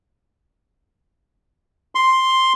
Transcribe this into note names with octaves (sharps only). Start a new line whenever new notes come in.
C6